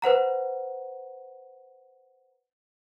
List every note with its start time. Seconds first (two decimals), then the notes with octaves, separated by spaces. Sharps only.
0.02 B4 C5 F#5 A#5